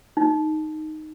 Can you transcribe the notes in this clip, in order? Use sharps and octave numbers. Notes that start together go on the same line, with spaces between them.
D#4